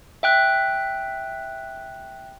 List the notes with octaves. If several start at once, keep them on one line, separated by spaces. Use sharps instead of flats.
E5 G5 F#6